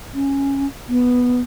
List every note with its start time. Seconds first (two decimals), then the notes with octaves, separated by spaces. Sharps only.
0.14 C#4
0.88 B3